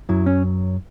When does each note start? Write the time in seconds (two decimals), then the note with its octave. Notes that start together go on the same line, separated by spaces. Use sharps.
0.09 F#2 F#3 E4
0.26 C#4